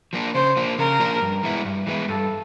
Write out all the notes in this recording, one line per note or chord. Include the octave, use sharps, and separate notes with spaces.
F3 A#3 D4
C#3 C5
F3 A#3 D4
C#3 A#4
F3 A#3 D4
G2
E3 G#3 B3 E4
G2
E3 G#3 B3 E4
G2 A4